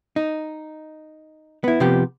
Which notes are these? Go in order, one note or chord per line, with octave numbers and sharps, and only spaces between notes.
D#4
B3 E4
C3 F3 B3 G4